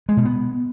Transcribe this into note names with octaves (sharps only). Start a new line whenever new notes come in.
G#3
B2
B3